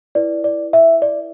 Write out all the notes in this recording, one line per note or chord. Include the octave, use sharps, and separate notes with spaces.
E4 B4 D5
D5
E5
D5